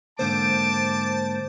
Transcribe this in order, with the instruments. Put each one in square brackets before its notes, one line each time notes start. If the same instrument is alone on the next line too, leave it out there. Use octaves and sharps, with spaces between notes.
[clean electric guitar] G#2 D3 A#3 [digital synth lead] C5 [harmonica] A5 [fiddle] D6